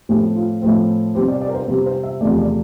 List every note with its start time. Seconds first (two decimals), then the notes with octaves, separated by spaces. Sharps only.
0.09 A2 F3 A3 C4 G4
0.35 F4
0.62 A2 F3 A3 C4
1.15 C3 G3 C4 G4
1.28 D5
1.42 D5
1.49 A#4
1.55 C5
1.68 C3 G3 C4 C5
1.86 C5
2.03 E5
2.21 E2 C3 F3 A3 D5
2.39 D5